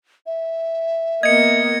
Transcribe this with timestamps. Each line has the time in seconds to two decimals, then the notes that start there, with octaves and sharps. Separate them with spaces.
0.26 E5
1.23 A#3 B3 D#5 G#6 C#7